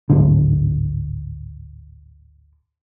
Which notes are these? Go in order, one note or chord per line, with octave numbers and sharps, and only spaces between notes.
D1 G#1 D3